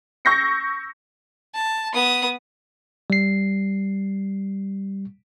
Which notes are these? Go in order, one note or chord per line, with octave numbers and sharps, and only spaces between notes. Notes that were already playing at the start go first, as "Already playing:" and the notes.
C#6 E6 G6 A#6 C7 C#7
A5
B3 D#6
G3 C7